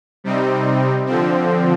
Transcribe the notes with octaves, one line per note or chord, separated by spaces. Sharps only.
C3 G3 C4 D#4
D3 F3 C4